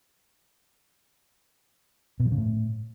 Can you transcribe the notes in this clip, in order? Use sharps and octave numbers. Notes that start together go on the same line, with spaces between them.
B2
F3
C#3
A2